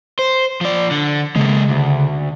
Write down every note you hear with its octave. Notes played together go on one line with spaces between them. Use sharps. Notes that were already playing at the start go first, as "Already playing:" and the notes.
C5
F3 D5
D3
C#3 G#3 A#3
D2